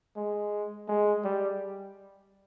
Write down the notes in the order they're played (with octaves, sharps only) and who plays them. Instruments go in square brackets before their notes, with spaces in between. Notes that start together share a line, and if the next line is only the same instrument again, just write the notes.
[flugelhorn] G#3
G#3
G3